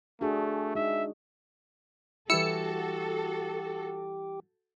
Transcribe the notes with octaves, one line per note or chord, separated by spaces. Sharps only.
A3 D4 F#4 G#4
G#3 D#4 E5
E3 G3 E4 F#4 G4 A4 E6 C#7